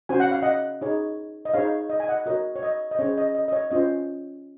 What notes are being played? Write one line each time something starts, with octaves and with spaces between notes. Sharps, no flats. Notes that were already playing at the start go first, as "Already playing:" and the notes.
C#4 F#4 C5 G#5
F#5
F5
D#5 F#5
D#4 G#4 C#5
D#5
D#4 G#4 C5 C#5 F5
D#5
G#5
D#5 F#5
F#4 A#4 C#5 D#5
C#5
D#5
D#5
C#4 G#4 C5 C#5
D#5
D#5
D#5
C#5
C#4 F4 C5 D#5